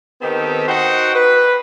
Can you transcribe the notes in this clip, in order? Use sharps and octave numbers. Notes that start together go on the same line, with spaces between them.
D#3 B3 C4 D#4 G4 A4
D#4 F#4 C5 F#5 G5
B4